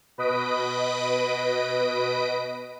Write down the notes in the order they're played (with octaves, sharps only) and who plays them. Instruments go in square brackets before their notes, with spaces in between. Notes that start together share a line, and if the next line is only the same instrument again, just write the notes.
[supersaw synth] B2 B4 D#5 D#6 B6 D7